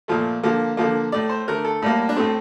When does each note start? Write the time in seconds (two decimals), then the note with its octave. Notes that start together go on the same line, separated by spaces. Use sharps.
0.08 A#2 F3 A3
0.43 D3 F3 A#3
0.77 D3 F3 A#3
1.12 A2 A3 D5
1.29 C5
1.48 D3 A3 A#4
1.64 A4
1.82 A2 G3 A#3
2.09 D4
2.16 A2 A3 C4